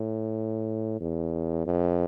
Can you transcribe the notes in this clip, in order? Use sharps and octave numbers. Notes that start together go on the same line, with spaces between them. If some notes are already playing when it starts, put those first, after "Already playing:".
Already playing: A2
E2
F2